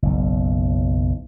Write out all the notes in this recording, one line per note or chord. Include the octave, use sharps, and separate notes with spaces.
F#1 B1